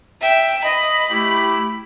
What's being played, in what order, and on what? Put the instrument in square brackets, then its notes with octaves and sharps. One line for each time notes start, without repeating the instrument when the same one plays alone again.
[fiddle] E5 G5
[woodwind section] D#5 [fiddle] B5
[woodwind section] A3 E4 G4